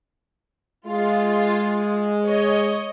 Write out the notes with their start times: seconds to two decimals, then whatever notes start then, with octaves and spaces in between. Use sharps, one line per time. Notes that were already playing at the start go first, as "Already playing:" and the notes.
0.86 G#3 F4
2.25 C#5 D#5